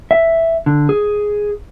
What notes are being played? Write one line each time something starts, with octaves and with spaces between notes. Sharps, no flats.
E5
D3
G#4